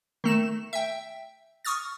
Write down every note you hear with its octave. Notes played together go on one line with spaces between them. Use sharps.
D#3 A3 E7
E5 G5
C#6 D#6 F6 A6